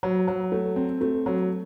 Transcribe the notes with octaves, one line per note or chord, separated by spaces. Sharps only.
F#3
F#3
A3
C4
A3
F#3